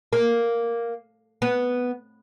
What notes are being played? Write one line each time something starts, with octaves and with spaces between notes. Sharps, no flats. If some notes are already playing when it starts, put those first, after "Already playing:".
A#3
B3